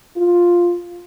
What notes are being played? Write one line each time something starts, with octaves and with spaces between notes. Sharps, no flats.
F4